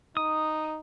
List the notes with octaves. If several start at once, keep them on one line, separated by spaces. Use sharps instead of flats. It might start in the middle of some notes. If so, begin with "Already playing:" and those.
D#4 D#6